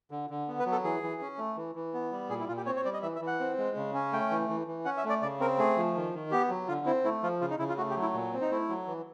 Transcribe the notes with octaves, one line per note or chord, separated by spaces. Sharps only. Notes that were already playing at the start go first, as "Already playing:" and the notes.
D3
D3
B3
B4
F#3
A4
E3 G#4
E3
C#4
A3
E3
E3
B3
G3
A#2 G#4
E4
A#2 F4
G4
C4 C#5
C#5
G3 D5
D#5
E3 E5
E5
E3
F#5
C4
G#3
C#3
C#4
A3 G5
E3
E3
E3
C#4 F#5
E5
A3
D5
C#3 D5
C4 A#4
A3 G#4
F3
D#3
D#3
B3 G4
F#3
D3 F4
C4 E4
A3 E4
F3 F4
C#3 F4
D#4
C#3 E4
F4
A3 F#4
G4
F#3
E4
A#2
C4
D#4
A3 E4
F#3
E3